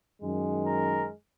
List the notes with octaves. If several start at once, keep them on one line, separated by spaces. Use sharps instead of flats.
F#2 D#3 G#3
A#4